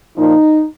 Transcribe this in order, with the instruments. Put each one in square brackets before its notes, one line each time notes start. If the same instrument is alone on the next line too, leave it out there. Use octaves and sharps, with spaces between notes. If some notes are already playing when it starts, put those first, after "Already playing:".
[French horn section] A#2 F3 D#4